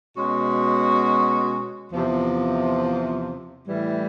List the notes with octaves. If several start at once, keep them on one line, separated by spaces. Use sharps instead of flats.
B2 G#3 C#4 F#4
E2 C3 F3
A2 E3 G3